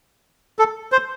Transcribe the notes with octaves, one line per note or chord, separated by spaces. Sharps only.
A4
C5